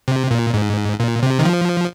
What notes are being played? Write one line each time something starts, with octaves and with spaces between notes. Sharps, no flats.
C3
A#2
G#2
A#2
C3
D#3
F3